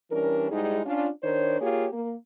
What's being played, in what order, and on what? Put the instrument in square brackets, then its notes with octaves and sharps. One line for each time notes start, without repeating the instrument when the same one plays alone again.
[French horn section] E3 G3 C#4 D4 A#4
G#2 G3 G#3 D#4 E4 G#4
C#4 D4 F4
D#3 D4 A#4 C5 C#5
A#3 F4 G4 G#4 C#5
A#3